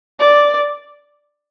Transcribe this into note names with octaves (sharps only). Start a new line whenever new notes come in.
D5